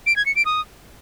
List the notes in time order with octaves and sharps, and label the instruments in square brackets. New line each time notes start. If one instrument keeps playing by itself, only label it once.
[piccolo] D7
G#6
C#7
D7
D#6